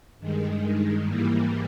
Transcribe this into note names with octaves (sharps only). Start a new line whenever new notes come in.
G2 D#3 G#3
G#2 E3 G3 A#3